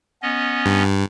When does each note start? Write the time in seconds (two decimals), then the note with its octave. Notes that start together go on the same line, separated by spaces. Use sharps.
0.22 B3 C#4 D#5
0.66 G2